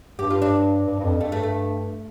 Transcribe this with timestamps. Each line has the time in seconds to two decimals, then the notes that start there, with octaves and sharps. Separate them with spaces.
0.19 G2 G4
0.30 F4
0.42 D4
0.87 G2
0.99 G2
1.04 F2
1.20 G2 A3
1.32 A3
1.43 A3